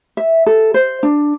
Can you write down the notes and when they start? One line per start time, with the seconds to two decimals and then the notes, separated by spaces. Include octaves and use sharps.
0.17 E5
0.46 A4
0.74 C5
1.03 D4